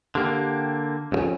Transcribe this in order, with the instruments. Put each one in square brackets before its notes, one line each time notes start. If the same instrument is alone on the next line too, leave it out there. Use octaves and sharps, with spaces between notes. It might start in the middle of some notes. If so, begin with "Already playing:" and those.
[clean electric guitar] D3 A#3 [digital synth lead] G4
[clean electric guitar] C2 F2 [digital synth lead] C#4